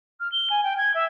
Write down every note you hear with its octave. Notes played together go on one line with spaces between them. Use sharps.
F6
G7
G#5
G5
G#6
E5